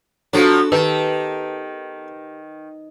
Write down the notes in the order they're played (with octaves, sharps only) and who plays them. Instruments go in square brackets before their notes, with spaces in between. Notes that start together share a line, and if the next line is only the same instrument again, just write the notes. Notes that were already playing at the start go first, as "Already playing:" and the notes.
[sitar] F3 F#3 [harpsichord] B3 A4 [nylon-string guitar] D4 F#4
[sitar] D#3 [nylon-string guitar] G4 A5 [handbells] B4